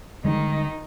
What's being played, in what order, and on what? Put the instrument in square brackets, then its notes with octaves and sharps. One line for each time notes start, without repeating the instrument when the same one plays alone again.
[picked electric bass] D3 G3 G#3 [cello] D#3 D#4